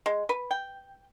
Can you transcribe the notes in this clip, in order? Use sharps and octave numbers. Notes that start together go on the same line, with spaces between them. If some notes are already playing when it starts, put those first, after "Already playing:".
G#3
B4
G5